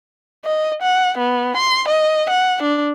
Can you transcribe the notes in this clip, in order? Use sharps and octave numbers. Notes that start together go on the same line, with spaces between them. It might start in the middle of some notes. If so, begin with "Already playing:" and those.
D#5
F#5
B3
C6
D#5
F#5
D4